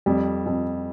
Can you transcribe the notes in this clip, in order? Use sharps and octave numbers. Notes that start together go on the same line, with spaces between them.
F2 G3
F2